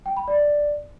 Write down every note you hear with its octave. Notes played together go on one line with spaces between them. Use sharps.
G5
B5
D5